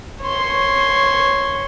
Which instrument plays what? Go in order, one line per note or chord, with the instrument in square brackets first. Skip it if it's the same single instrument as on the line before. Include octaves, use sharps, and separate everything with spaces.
[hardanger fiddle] C#5 C6